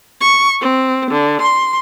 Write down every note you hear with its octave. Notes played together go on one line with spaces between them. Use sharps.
C#6
C4
D3
C6